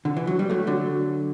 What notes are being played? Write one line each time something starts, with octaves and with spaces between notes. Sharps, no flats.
D3
E3
F#3
G3
F#3 A3
D3 F#3